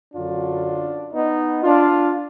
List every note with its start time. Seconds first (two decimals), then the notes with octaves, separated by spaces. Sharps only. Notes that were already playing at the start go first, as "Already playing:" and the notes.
0.14 F#2 D3 F#3 D4 F4
1.13 B3 D#4
1.63 D4 F4